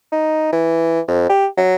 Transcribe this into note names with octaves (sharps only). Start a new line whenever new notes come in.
D#4
E3
F2
G4
F#3